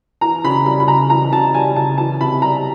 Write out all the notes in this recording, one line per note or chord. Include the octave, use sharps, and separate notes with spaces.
E3 A#5
C#3 B5
G3 B5
B5
C#3 A#5
E3 A#5
C#3 A5
G3 G#5
C#3 A5
E3 A5
C3 B5
G3 A#5